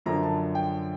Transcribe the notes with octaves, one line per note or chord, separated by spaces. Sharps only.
F#2 D3 F3 A#5
A5
G5